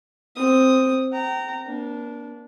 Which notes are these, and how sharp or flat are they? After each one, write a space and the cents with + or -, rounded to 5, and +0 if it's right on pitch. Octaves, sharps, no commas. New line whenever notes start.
C4 +0 D#6 +0
G5 -35 A#5 -15
A#3 +35 D4 -15